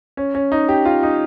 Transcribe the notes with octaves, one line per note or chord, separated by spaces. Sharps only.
C#4
C#4
D#4
G4
F4
D#4